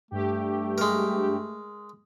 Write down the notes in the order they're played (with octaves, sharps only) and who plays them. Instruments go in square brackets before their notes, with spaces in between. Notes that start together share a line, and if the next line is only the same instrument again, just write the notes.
[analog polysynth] G2 G4 [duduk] A3
[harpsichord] G#3 A#4